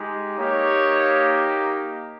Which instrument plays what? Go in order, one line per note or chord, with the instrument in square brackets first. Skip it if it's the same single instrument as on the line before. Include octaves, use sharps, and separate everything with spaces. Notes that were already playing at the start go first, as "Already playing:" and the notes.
Already playing: [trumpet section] G#3 D#4 G4
A#3 D#4 G4 C#5